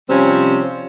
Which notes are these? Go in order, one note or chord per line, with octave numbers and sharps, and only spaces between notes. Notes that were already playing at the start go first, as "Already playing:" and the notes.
C3 F3 G3 C4 C#4